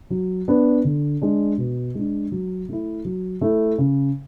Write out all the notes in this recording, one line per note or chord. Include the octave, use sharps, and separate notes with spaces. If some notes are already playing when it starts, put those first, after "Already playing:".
F#3
B3 D4
D3
G#3 D4
B2
G#3 D4
F#3
A3 E4
F#3
A3 E4
C#3